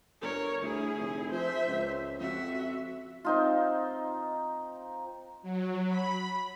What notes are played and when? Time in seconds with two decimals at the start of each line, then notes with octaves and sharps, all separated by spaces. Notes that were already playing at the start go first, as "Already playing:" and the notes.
0.21 G1 A#4 C#5
0.62 D2 E4 G#4
0.98 F1
1.32 F3 C5 E5
1.68 C#2
2.20 F2 F#4 E5
3.25 C4 D#4 F4
5.43 F#3
5.87 B5